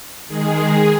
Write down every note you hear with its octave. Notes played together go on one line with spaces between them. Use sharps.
D#3 G#3 G#4